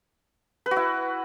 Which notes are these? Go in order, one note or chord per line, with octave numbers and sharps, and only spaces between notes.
B4
F#4
E4